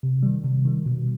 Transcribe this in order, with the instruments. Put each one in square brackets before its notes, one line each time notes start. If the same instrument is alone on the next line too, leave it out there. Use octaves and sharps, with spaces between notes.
[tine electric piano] C3
D#3 G3
C3
D#3 G3
B2